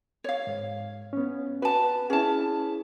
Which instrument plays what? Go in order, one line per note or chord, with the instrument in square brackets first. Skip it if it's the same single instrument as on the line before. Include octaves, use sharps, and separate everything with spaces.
[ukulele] C#5 F5
[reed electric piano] G#2
B3 C#4
[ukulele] F#4 A5 [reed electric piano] B4
[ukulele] C#4 A5 [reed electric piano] E4 G#4